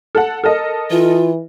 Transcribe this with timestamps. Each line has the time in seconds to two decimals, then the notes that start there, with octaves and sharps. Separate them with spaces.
0.15 A4 F#5
0.44 A4 A#4 D#5
0.91 E3 F4